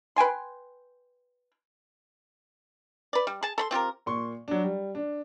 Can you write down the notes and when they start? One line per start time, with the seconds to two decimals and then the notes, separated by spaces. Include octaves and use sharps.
0.16 B4 G5 G#5 C6
3.13 B4 D5
3.27 G3
3.43 G#4 A5
3.58 A4 B5 C6
3.71 C4 F4 G4 A#4
4.06 A#2 C6 C#6
4.48 F#3 D4
4.64 G3
4.95 D4